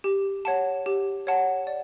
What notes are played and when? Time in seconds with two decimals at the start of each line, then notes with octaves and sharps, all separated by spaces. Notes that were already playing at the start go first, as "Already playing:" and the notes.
0.04 G4
0.45 C#5 F#5 A5
0.86 G4
1.27 C#5 F#5 A5
1.67 D5